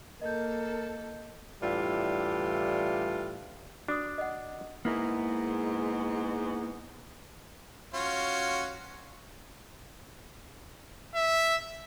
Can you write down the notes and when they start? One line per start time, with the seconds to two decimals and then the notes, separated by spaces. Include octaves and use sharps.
0.21 A#3 A4 A#4 D#5 G6
1.62 A2 E3 G3 D4 F4
3.88 D4 F#4 D6 D#6
4.18 D#5 F#5
4.85 G#2 G#3 A#3 B3 E4 A#4
7.94 C#4 F4 F#4
11.15 E5